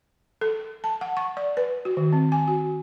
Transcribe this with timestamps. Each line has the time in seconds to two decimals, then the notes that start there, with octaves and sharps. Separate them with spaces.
0.41 A4
0.84 A5
1.01 F#5
1.17 C#6
1.37 D5
1.57 B4
1.85 F#4
1.97 D#3
2.13 C4
2.32 G#5
2.48 F#4